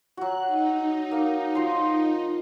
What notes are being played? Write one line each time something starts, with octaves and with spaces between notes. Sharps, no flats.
F#3 F#4 F#6
D#4
A#3
F3 C6